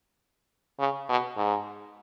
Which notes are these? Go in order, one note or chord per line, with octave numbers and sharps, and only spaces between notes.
C#3
B2
G#2